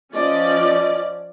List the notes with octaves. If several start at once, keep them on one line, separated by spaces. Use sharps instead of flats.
F3 C#4 D5 D#5